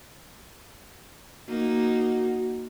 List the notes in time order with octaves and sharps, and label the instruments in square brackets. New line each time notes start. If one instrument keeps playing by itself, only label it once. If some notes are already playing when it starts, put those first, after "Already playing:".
[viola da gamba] A#3 D#4 [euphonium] F#4